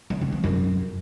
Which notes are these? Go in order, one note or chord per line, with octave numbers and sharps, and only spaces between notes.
E3
C#3
F3
F#2